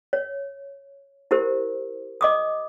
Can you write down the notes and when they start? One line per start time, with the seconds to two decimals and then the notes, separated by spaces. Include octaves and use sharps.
0.13 C#5
1.31 E4 G4 A#4 C5
2.21 D#5 D6 D#6